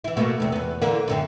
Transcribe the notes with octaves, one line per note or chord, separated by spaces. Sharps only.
E3 E4
B2 A3 A#3
E2 C3
E2 B3
D3 E3 A#3
F#2 D3 C4